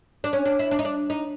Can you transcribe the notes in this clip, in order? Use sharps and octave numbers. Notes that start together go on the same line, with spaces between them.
D4
C#4
D4
E4
D4
D#4
D4
D#4